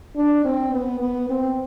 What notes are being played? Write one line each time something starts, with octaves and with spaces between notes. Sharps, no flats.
D4
C4
B3
B3
C4